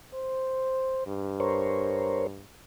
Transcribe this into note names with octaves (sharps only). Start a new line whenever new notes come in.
C5
G2
A#4 C5 C#5